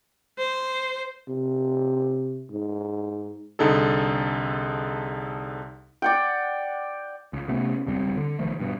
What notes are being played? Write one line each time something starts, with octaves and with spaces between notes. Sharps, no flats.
C5
C3
G#2
C2 D3 D#4 G#4 A4
D5 F#5 G5
C#2
C3 A3 B3 C#4
E1 C#2 G3 C4
D3
B1 D#3 F3 A3
G2 B2